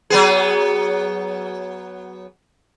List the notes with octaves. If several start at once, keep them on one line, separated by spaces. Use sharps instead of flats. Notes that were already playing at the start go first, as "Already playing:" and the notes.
F#3 B3 G#4